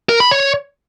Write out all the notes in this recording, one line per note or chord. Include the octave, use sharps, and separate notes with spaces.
A#4
B5
C#5